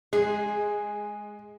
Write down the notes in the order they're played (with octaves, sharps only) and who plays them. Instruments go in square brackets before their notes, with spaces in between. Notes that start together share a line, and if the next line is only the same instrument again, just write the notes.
[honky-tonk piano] G#3 [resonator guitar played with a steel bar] G#4